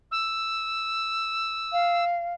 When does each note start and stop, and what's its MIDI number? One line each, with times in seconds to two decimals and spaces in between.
0.11 2.04 88
1.72 2.33 77